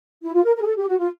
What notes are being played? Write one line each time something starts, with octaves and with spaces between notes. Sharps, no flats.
E4
F4
A#4
A#4
G#4
A4
G4
F#4
F4